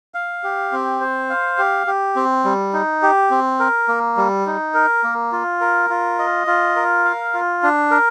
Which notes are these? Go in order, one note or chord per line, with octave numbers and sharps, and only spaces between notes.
F5
G4
C4
C5
F5
G4
G4
C4
G3
D#4
G4
C4
A#4
A#3
G3
D#4
A#4
A#3
F4
A#4
F4
D#5
F4
A#4
F5
F4
D4
A#4